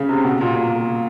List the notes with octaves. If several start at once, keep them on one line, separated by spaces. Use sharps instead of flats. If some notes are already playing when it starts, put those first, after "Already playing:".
Already playing: C#3
C3
B2
A#2
A#2